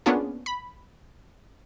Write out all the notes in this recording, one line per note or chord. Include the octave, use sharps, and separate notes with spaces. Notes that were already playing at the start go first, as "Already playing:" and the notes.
A#3 B3 C#4 D4 F4 G#4
B5